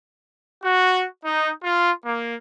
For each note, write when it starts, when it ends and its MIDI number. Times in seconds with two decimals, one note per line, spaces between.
0.64 1.06 66
1.25 1.51 63
1.63 1.91 65
2.05 2.36 58